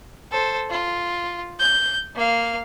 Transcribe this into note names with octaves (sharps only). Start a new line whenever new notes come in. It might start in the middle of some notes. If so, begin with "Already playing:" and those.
A4 C5
F4
G6
A#3 F5